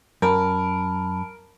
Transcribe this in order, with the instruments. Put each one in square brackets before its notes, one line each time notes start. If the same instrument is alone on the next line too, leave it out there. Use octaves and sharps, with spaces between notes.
[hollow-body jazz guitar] F#2 [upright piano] A#4 [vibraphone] A5 B5